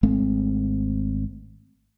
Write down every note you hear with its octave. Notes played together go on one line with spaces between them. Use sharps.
G#1 G#3 A3 C4